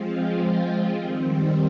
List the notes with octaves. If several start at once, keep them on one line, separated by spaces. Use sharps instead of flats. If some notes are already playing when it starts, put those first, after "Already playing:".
Already playing: F3 G#3 C4 F4
D#3 G3 C4